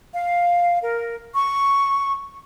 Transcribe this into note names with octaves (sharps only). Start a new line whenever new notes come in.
F5
A#4
C#6